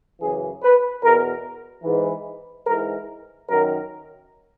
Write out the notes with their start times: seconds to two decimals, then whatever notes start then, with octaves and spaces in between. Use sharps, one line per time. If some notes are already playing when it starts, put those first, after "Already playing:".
0.20 F#2 C#3 E3 G#4
0.62 B4
1.02 E2 B2 A#4
1.84 G#2 E3
2.66 G#2 E3 A#4
3.48 F#2 D#3 A#4